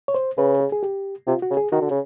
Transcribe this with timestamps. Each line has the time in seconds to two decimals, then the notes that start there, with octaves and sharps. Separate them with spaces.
0.08 C#5
0.15 C5
0.38 C#3 B4
0.60 G#4
0.72 G#4
0.83 G4
1.27 C3 F4
1.42 F#4
1.50 C#3
1.57 G#4
1.72 D#3 F#4
1.81 D3
1.90 C#3